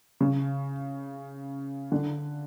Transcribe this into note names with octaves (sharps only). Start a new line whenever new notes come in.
C#3
D3